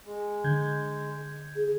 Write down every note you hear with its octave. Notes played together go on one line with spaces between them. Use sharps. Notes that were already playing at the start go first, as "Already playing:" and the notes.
G#3
D3 G6 G#6
G#4